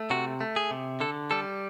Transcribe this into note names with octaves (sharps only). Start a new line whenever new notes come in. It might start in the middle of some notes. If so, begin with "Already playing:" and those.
Already playing: A3
C3 F#4
A3
G#4
C3
D3 A4
G3 A4